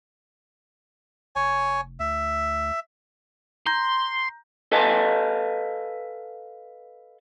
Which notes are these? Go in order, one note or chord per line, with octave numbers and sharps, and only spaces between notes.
F1 C#5 G#5
D2 E5
A#5 C6 G6 A#6
A4 B4 D#5 F5 G#5 A5